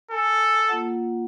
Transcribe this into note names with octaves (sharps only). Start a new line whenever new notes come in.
A4 G#5
A#3 F4 F#5